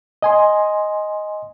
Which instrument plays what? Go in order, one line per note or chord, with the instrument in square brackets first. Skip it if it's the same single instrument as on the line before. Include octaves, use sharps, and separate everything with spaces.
[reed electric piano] D#5 G#5 C6